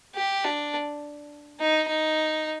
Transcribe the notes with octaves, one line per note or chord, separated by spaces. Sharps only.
G4
D4
D#4
D#4